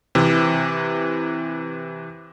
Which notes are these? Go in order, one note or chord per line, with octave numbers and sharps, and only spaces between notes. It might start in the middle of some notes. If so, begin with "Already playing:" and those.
C3 E3